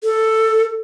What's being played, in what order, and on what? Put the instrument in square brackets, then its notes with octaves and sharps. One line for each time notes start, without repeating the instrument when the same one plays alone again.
[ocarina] A4